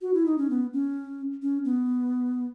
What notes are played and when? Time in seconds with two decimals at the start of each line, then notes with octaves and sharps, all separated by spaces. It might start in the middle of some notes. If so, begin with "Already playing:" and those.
0.01 F#4
0.14 E4
0.26 D#4
0.38 C#4
0.50 B3
0.73 C#4
1.42 C#4
1.65 B3